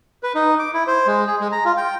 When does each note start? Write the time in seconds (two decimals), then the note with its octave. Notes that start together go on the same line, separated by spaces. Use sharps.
0.23 B4
0.35 D#4
0.59 D6
0.74 E4
0.87 C5
1.07 G#3
1.27 G#4
1.41 G#3
1.52 A#5
1.65 F4
1.77 G5